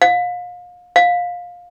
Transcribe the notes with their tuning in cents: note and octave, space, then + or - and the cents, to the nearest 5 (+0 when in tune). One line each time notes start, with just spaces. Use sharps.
F5 +35
F5 +20